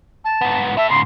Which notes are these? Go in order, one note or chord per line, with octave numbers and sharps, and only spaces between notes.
A5
G#2 B3
E4 A4 E5
G#2 C#3 C6